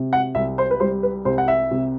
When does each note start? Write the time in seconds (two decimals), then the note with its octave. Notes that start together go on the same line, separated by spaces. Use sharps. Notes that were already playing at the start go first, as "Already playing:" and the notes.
Already playing: C3
0.13 F#5
0.35 C2 E5
0.58 C5
0.71 B4
0.80 G3 C5
1.03 B4
1.25 C2 C5
1.38 F#5
1.48 E5
1.71 C3